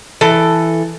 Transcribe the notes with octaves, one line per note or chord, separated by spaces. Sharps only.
E3 A4